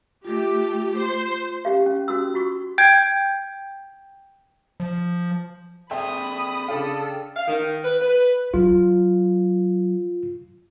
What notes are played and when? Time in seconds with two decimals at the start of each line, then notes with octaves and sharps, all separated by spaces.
0.25 A3 F4 G4
0.98 C5
1.65 C#4 G4 F5
1.86 C#4
2.08 C#4 F#4 D#6 E6
2.34 F4 F#4 C#6
2.78 G5 G6 G#6 D7
4.80 F3
5.91 C4 G#4 A4 E5 G5 B5 C6 D#6
6.68 C#3 D4 A4 F5 G5
7.36 F5
7.48 D#3
7.83 B4
8.00 B4
8.54 F#3 F4